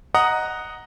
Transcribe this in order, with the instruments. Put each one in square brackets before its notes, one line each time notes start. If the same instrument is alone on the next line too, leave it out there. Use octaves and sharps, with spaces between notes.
[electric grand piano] D#5 F#5 A#5 D#6